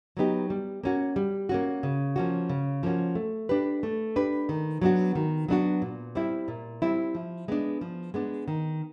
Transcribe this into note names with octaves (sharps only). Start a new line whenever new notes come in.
F#3 B3 D#4 G4
G3
A#3 C#4 F#4
G3
A#3 C#4 F#4
C#3
F3 A#3 C#4 F#4
C#3
F3 A#3 C#4 F#4
A3
D4 G4 B4
A3
D4 G4 B4
D#3
F#3 B3 D4 F#4
D#3
F#3 B3 D4 F#4
A#2
G3 C4 E4
A#2
G3 C4 E4
F3
G#3 B3 D4
F3
G#3 B3 D4
D#3